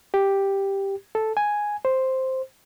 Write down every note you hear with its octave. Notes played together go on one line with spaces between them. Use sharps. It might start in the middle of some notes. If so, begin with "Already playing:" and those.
G4
A4
G#5
C5